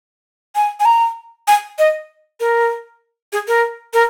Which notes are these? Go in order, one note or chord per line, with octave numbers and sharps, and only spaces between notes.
G#5
G#5
A#5
G#5
D#5
A#4
G#4
A#4
A#4